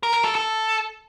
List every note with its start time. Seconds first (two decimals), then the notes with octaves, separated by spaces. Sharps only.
0.03 A#4
0.14 A#4
0.24 A4
0.35 A4